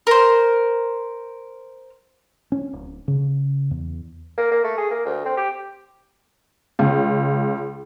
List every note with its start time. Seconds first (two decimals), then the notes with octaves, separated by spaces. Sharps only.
0.07 A#4 C5
2.52 C#4
2.73 D1
3.08 C#3
3.71 E2
4.38 A#3
4.51 A#3
4.64 A3
4.78 G#4
4.91 A#3
5.05 D2
5.25 C4
5.37 G4
6.79 C#2